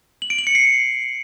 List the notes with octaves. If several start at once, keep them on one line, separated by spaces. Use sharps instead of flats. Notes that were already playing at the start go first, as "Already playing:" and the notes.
F#7
D7
F#7
C#7
C7